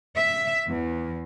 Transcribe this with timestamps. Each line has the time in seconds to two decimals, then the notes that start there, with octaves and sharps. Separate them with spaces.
0.17 E5
0.68 E2